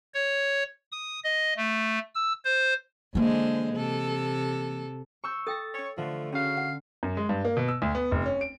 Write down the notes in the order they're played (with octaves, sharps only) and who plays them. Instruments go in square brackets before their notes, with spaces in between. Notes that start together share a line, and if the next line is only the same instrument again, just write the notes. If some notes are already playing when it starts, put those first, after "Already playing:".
[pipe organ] C#5
D#6
D#5
A3
E6
C5
[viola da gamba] D3 G#3 C5 [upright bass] E3 A#3
[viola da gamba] C3 A4
[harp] C#6 E6 G6
[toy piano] A4 G5 [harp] A6 A#6
[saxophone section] C#5
[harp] D3 [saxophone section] F3 A3
[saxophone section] C#3 F#4 F5 [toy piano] C#4
[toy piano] F#5
[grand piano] F#2
G#3
G2
A#3
B2
E6
D2
B3
F1
C#4
D7